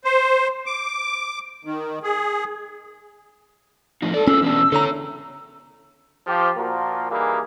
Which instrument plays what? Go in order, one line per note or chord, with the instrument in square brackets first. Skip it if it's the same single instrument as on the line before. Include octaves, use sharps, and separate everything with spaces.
[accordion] C5
D6
D#3
G#4
[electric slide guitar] A2 F3 D#4
[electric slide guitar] G#2 D5 [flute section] A4
[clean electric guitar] C#4 [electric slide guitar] F4 G#4 A4 [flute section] E6
[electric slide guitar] E2 B2 D4
[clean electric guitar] D3 A#5 [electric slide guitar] A4 C#5
[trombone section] F3 G4
A#2 F3 A#3 F4 F#4 A#4
E3 G3 A#3 D#4 G#4